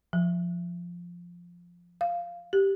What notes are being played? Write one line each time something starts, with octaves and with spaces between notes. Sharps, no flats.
F3
F5
G4